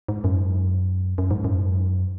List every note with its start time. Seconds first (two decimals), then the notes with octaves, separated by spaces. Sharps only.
0.08 G#2
0.24 F#2
1.18 F#2
1.31 G#2
1.44 F#2